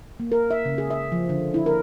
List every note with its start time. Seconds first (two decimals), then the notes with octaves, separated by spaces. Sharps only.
0.20 A#3
0.32 A#4
0.51 E5
0.65 C#3
0.78 G#4
0.91 E5
1.12 F3
1.29 D3
1.54 E4
1.66 A#4